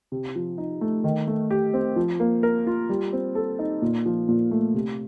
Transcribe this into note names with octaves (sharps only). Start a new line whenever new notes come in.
C3
F3
D#4
A3
D#3
A3
G4
C4
F3
A#3
A#4
F4
G3
C4
A4
D#4
A#2
F3
A#2
A3
C3